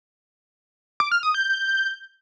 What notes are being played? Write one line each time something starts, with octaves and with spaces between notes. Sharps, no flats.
D6
F6
D#6
G6